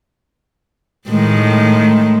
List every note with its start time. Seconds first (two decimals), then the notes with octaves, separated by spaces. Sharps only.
1.09 A2 D#3 G#3